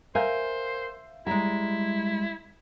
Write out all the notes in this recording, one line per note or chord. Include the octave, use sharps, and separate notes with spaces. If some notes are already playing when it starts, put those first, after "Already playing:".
A#4 C5 E5 F5 G#5 G6
G3 G#3 E4 A#5